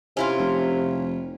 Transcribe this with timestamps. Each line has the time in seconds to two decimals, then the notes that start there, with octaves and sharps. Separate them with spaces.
0.17 C3 C#4 E4 F4
0.38 F1